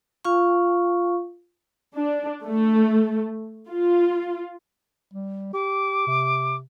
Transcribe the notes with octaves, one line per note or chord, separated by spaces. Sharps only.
F4 F5 C#6
D4
A3
F4
G3
G4 D6
C3